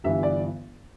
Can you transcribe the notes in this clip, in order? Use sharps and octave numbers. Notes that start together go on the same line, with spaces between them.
G1 G2 E3 E5
D5